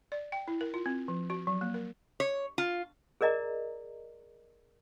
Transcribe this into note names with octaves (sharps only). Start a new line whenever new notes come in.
D5
G5
E4
A#4
F4
C4
F3
F#4
F#3
A#3
A#4
C#5
F4
G#4 A#4 D5 D#5 A#5